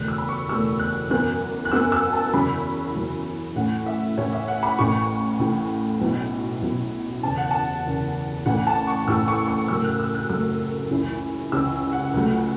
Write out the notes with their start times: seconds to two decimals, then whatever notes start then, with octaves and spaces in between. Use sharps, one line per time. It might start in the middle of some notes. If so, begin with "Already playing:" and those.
Already playing: F#1 E2 B2 A3 F#6
0.08 E6
0.18 B5
0.29 C#6
0.49 F#1 E2 B2 A3 E6
0.79 F#6
1.10 F#2 E3 B3 F#6
1.65 F#6
1.72 F#2 E3 B3 E6
1.92 E6
2.13 A5
2.33 E2 C#3 F#3 C#4 E4 B5
2.94 E2 C#3 F#3 C#4 E4
3.56 A2 E3 C#4 F#5
3.86 E5
4.17 A2 E3 C#4 C#5
4.33 E5
4.48 F#5
4.63 B5
4.79 A1 A2 E3 C#6
5.39 A1 A2 E3
6.01 B1 B2 F#3 B3 E4
6.62 B1 B2 F#3 B3 E4
7.23 F#1 E2 C#3 A5
7.38 F#5
7.51 A5
7.85 F#1 E2 C#3
8.46 A1 A2 E3 F#5
8.67 A5
8.87 C#6
9.07 A1 A2 E3 E6
9.28 C#6
9.48 C#6
9.68 F#1 F#2 F#3 A3 E6
9.84 F#6
10.00 E6
10.15 F#6
10.30 F#1 F#2 F#3 A3 E6
10.91 C#2 C#3 E3 C#4 E4
11.52 C#2 C#3 E3 C#4 E4 E6
11.93 F#5
12.13 C#2 C#3 F#3 A3